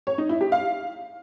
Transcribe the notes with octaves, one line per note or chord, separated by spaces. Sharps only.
C#5
D#4
E4
G4
F5